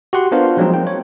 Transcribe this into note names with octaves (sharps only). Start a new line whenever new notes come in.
F#4 G4 F#5 C6
B3 D4 F4 A#4 C5 F5
F3 F#3 G#3 A#3 C4 D#4
G5
C#5